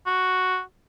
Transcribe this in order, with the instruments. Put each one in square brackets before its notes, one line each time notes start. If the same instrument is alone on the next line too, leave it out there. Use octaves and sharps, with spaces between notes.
[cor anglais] F#4